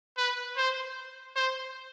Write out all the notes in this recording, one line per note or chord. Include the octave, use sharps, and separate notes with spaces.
B4
C5
C5